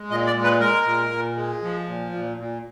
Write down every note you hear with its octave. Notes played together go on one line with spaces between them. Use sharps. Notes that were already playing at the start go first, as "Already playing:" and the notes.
Already playing: G#3
A#2 D#5
D5
G#3
B4
G#3 A#4
A#2
A#2
G#3
F3
A#2
A#2
A#2